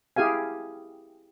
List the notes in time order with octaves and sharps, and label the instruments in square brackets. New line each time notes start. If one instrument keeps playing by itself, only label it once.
[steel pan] E4 G4 G#4 F5 G#5